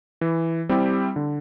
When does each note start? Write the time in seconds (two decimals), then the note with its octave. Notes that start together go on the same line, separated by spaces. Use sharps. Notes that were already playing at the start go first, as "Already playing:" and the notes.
0.21 E3
0.69 G3 C4 E4 G4
1.16 D3